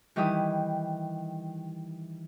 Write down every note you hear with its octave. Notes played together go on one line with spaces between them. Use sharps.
D#3 E3 G3 E4 G4 D#6